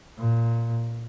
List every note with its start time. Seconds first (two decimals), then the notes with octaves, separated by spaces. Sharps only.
0.18 A#2